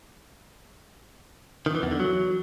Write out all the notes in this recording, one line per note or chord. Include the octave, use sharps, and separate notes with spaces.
D#3
E3
E2
D3
F#3